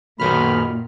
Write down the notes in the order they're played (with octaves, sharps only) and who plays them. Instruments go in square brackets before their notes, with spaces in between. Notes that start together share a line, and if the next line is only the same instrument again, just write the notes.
[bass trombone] B1 [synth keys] F#2 D#3 F6 [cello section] A#2 [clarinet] B5